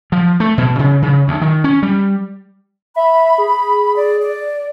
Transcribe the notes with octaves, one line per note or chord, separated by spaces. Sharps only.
F3
A3
B2
C#3
C#3
D2
D#3
C#4
G3
E5 B5
G#4
D5
D5